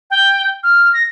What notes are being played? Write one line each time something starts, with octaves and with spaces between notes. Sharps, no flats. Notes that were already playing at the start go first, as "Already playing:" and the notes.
G5
F6
A#6